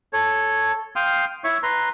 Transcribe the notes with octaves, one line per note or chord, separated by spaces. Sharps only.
A4 C#5
F5 G5 C6 D#6 F6
E4 C#5 E5 C#6
B4 A#5 C6